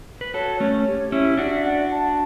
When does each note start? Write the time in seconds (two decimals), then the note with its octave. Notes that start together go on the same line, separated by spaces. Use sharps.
0.21 B4
0.34 F#4 A4 C#5
0.60 A3 C#4 C#5
0.87 G4
1.12 C#4 E4 E5
1.37 D4 F#4 D5
1.64 F#5
1.89 A5